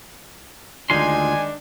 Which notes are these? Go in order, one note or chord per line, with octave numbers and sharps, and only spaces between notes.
D2 D#3 G#3 D4 D#4 F4 G#5 C6